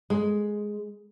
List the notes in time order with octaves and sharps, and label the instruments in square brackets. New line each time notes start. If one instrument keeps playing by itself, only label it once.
[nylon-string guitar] G#3